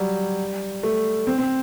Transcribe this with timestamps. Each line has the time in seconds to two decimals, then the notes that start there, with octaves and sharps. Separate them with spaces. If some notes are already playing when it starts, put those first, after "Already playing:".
Already playing: F#3 G3
0.83 A3
1.27 C4
1.38 C4